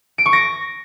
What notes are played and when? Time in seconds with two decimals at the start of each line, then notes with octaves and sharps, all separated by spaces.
0.18 D7
0.26 C#6
0.33 A#6